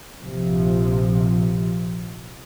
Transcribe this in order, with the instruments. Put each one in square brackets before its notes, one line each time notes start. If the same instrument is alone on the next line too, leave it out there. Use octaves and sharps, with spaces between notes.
[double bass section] A#1 C3 F3